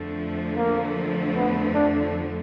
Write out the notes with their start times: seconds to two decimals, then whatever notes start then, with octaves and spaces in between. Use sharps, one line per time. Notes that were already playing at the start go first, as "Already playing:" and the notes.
Already playing: F2 D3 F3 A3
0.57 A#3
1.36 B3
1.74 D4